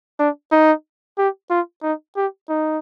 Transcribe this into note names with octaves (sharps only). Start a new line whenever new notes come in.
D4
D#4
G4
F4
D#4
G4
D#4